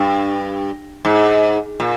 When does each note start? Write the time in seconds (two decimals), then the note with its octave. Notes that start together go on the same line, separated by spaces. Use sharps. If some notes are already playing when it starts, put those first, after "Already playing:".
Already playing: G2
1.05 G#2
1.80 A#2